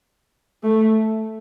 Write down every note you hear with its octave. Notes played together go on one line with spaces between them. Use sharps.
A3